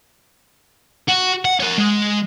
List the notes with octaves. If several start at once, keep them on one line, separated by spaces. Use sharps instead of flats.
F#4
F#5
A#4 C#5
G#3